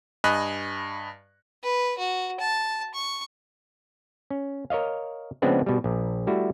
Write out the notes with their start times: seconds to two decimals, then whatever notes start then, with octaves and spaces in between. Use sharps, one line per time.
0.24 G2 D#5 G#5 B5 F#6
1.64 B4
1.98 F#4
2.40 A5
2.94 C#6
4.30 C#4
4.70 A#4 C#5 D#5 F5
5.42 C#3 F3 G#3 B3 C4 D4
5.66 B2 G3
5.84 A#1
6.27 G3 A3 E4 F#4